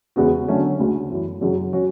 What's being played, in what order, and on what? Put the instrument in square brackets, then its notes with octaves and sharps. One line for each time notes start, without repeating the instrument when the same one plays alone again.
[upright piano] E2 C#3 G#3 B3 F#4
D3 F#3 A3 C#4
D2 C#3 G#3
F#2 E3 A3
F#2 C#3 F#3
F#3 C#4 F#4